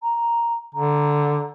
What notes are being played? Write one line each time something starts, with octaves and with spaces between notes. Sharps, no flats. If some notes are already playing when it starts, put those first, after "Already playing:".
A#5
D3 A#5